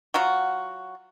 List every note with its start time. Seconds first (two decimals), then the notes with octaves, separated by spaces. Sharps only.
0.14 F#3 F4 F#4